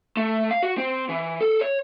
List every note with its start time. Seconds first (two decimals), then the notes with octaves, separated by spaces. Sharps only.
0.17 A3
0.51 F5
0.62 F#4
0.78 C4
1.09 E3
1.41 A4
1.61 C#5